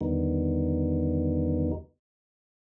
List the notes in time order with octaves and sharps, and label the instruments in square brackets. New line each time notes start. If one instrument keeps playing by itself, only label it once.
[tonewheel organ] E2 D3 D#3 G3 B3 D#4